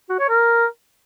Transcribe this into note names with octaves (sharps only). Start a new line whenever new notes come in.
F#4
C#5
A#4